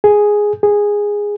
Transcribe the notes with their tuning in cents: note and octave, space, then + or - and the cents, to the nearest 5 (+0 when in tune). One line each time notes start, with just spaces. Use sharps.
G#4 +0
G#4 -10